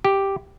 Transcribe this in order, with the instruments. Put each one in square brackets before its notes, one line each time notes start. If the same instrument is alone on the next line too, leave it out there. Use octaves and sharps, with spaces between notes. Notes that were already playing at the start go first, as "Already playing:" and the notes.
[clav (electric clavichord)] G4